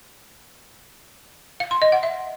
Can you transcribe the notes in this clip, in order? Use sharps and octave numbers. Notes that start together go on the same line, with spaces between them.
F5
C6
D#5
F#5
E5